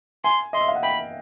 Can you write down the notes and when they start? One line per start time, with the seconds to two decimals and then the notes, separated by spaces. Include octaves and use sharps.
0.24 G#5 C6
0.53 D#5 C6
0.61 E5
0.68 F5
0.75 F#5
0.83 G5 B5